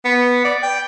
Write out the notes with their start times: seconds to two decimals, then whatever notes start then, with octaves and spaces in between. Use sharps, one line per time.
0.05 B3
0.44 D5
0.63 G5